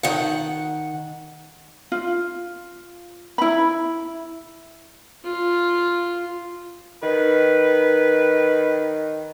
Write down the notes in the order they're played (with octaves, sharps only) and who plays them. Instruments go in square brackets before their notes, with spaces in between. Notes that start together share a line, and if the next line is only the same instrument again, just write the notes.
[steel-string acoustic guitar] D#3 F#5
[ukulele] F4
E4 B5
[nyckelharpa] F4
[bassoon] D#3 [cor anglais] B4